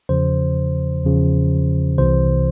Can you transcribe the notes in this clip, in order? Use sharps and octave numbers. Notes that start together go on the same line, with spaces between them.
E2 C#3 F3 C5
E2 C#3 F3
C2 C3 E3 C5